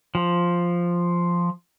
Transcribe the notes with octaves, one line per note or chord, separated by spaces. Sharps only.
F3